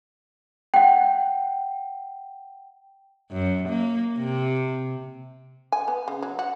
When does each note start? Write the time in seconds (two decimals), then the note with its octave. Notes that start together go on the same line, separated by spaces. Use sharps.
0.74 F#5 G5
3.32 F#2
3.68 A#3
4.18 C3
5.72 G#5
5.88 B3
6.08 C#3
6.22 F#3
6.39 F#4